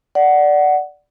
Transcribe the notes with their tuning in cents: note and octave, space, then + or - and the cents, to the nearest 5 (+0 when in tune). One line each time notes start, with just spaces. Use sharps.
D5 +0 F#5 +10